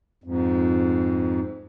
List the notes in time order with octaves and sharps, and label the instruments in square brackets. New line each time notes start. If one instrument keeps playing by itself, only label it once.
[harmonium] F2 G#2